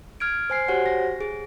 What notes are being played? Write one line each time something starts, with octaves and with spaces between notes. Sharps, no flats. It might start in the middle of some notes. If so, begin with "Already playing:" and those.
F6 G#6 D7
C5 G#5 C7
F#4 G4 C5 C#5 F#5
A#6
G#4